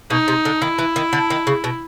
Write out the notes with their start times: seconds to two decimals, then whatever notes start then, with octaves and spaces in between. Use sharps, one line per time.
0.10 B2 D#4
0.28 C3
0.45 D3
0.61 D#3 E4
0.79 E3
0.96 D#3
1.13 D3
1.30 D#3
1.47 C#3
1.64 B2